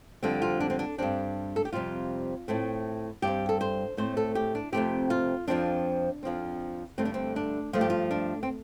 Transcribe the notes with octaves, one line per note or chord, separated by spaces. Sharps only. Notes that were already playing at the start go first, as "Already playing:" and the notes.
F2 D3 G3 C4
F4
D4
C4
D4
G2 G3 C4 D4
A4
G4
F2 C3 G3 C4 F4
A2 A3 C4
G2 G3 C4 G4
A4
C5
A2 A3 C4 C5
A4
G4
D4
F2 C3 A3 C4 G4
F4
F2 F3 C4 D4
F2 F3 C4
G2 D3 A3 C4
D4
C4
D4
G2 F3 A3 F4
G4
F4
D4
C4